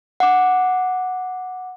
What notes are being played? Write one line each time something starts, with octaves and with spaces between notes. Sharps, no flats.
F#5 D6